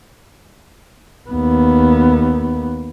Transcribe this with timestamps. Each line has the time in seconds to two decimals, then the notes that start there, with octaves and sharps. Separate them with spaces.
1.30 D#2 B3